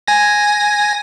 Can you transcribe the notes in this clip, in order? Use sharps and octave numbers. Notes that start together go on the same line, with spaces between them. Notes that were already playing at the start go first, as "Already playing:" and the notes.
G#5 A#6